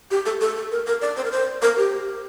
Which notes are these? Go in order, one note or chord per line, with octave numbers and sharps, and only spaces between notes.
G4
A4
A4
A4
A#4
A#4
D5
C5
A#4
C5
A#4
G4